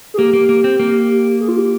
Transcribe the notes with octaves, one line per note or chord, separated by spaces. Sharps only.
G#4
A#3 G4
A#3
A#3
C4
A#3
G#4
F4
G4